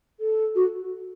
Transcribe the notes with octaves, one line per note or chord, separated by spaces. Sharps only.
A4
F#4